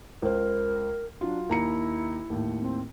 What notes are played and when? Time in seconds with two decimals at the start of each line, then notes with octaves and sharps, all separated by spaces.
0.22 C#2 A#4 C5
1.21 F#3 D4 F4
1.49 D#2 E4 A#5 C#7
2.30 D#2 A2
2.60 C4